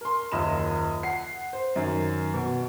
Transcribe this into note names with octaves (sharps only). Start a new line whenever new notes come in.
A#4 C6
F#1 D#2 F4 D#5 B5 E7
F#5 C7
C5
F#2 D#3
B2